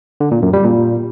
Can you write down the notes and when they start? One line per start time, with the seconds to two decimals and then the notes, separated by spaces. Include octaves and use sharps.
0.20 D3
0.31 A#2
0.42 F#2
0.53 G3
0.64 A#2